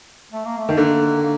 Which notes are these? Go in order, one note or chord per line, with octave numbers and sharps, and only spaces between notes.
A3
A#3
A3
D#3
D3 A#3
A#3